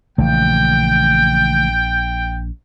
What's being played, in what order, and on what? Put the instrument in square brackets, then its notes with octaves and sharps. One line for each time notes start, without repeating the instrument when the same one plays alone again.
[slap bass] A#1 [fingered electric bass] C#3 E3 A3 [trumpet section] G5